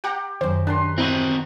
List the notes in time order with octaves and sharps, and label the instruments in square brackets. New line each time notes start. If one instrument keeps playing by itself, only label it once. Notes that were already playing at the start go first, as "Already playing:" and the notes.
[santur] G4 [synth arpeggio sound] F#5 G5 A#5
[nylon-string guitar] F#2 D#3 [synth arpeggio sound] C5
[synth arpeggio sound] D4 [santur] B4 A#5 C6
[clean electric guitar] C4 D#4 F#4 [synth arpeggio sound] E4